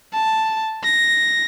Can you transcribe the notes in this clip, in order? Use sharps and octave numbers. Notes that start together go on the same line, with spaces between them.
A5
A#6